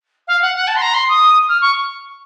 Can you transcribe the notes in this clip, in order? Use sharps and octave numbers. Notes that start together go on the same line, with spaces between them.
F5
F#5
F#5
A5
C6
A#5
C6
D#6
F6
C#6